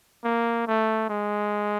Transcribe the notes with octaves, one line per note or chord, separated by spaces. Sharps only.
A#3
A3
G#3